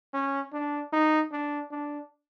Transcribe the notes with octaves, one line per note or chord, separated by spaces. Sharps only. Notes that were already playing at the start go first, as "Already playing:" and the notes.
C#4
D4
D#4
D4
D4